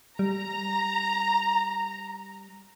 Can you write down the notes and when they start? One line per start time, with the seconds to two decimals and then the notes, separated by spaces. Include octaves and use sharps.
0.19 G3 A#5